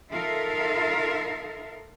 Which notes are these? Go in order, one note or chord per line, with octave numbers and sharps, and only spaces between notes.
D#4 F4 A4 A#4 E5 F5